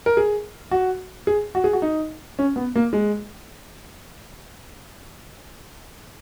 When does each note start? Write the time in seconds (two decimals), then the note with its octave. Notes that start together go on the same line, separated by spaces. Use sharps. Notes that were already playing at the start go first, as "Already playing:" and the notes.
0.06 A#4
0.17 G#4
0.71 F#4
1.27 G#4
1.55 F#4
1.64 G#4
1.73 F#4
1.82 D#4
2.39 C#4
2.56 B3
2.76 A#3
2.93 G#3